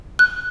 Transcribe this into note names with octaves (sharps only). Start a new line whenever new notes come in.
F#6